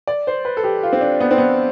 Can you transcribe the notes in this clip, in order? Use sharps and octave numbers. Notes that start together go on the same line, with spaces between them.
D5
C5
B4
A4
G4
F4
C4
D4
B3
C4
B3